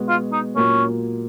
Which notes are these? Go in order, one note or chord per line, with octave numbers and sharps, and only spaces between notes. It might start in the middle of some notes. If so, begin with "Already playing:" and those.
Already playing: B2 G#3 B3 F#4
F4
D#4
A#2 F#3 A#3 C#4